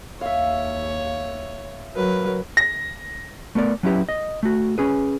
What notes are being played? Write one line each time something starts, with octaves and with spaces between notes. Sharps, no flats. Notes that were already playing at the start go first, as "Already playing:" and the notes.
D#2 C#5 E5 F5
F#3 A#4 B4
A#6
A3 B3 A#4 D5
F#3 C#4 E4 G4 B4
D#5
A3 F#4
C#4 G#4 B4